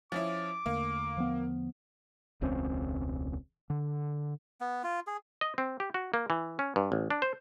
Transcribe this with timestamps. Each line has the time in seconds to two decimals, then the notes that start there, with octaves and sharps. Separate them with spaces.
0.12 F3 C#4 E4 D6
0.66 E2 D3 A3 A#3
1.17 F3 B3
2.42 E1 C#2 C4 C#4
3.70 D3
4.61 B3
4.84 F4
5.07 G#4
5.41 D#5
5.58 C4
5.80 G4
5.94 F#4
6.14 A#3
6.30 E3
6.59 C#4
6.76 G2
6.92 A1
7.10 D4
7.22 C5